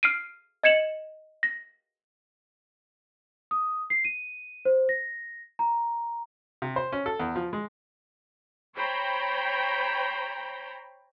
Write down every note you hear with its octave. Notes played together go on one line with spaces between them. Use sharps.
F6 C7 D7 D#7
D#5 G#6 C#7 E7 F#7
A#6
D#6
C7
D#7
C5
A#6
A#5
C3
C5
C#4
A4
E2
F3
G#3
C5 C#5 G5 A#5 B5